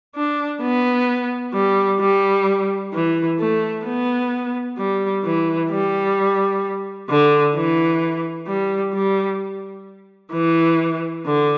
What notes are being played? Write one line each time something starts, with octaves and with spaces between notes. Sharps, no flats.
D4
B3
G3
G3
E3
A3
B3
G3
E3
G3
D3
E3
G3
G3
E3
D3